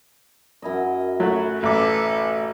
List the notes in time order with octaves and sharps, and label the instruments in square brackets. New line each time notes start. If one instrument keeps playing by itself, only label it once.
[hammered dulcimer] F#2 E4 D#5
[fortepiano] F#3 A3 F#4 [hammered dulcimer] B5
[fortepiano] A1 D6 [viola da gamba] A4 B4